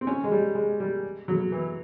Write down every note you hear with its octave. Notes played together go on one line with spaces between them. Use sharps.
C4
C#4
G#3
G3
G#3
G3
F#3
E3